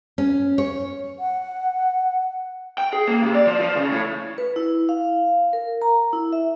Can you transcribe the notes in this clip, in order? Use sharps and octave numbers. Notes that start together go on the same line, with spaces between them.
C#4
C#5
F#5
G5
G#4
A#3
C3
D5
F3
F3
C#3
A2
B4
E4
F5
A#4
A#5
E4
E5